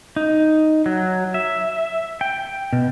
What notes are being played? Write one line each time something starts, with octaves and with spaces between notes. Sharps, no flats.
D#4
F#3
E5
G5
B2